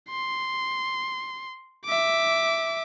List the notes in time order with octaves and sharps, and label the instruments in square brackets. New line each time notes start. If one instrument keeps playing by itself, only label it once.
[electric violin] C6
E5 D6